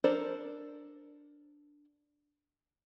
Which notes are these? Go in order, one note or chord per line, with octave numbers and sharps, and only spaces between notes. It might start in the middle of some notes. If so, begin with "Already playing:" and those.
D4 A4 A#4 C5 D5